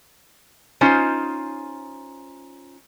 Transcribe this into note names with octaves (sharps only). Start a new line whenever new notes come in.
C#4 D#4 F4 C5